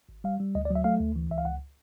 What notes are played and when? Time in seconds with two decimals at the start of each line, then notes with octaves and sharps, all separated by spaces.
0.09 G#1
0.24 G3 F5
0.40 G3
0.55 D2 D#5
0.65 D5
0.70 F#3
0.75 E5
0.84 A3 F5
1.00 D2
1.16 E3
1.30 C#2 E5
1.38 F5
1.45 C#2 F#5